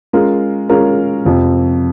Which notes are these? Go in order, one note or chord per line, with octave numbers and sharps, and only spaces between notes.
G#3 C#4 F4 A#4
G#3 C#4 F4 A#4
F2 C3 F3